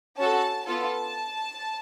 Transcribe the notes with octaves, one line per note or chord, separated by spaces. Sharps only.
C#4 F#4 A4 A5
B3 F4 A4 A5